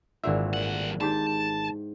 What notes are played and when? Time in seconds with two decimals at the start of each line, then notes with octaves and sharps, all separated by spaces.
0.24 G#1 A#2 D3 E3 E5
0.53 G2 F#5
1.01 G#2 G4 A5